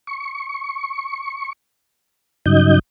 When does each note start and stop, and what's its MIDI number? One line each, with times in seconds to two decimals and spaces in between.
0.07 1.53 85
2.46 2.79 43
2.46 2.79 49
2.46 2.79 54
2.46 2.79 63
2.46 2.79 75
2.46 2.79 91